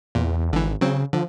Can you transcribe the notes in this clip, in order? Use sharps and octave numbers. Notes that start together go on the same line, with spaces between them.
E2 A#2
G#1 D3 E3
C#3 F#3 C4
D3 F3